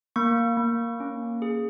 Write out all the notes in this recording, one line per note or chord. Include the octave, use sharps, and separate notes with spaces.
A#3 C#6
A#3
C#4
G#4